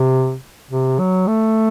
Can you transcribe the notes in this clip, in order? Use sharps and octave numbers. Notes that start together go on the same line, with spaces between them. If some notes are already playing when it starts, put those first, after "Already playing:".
Already playing: C3
C3
F#3
A3